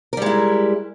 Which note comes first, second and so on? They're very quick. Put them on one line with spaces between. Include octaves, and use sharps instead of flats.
A#4 G3 G#3 E4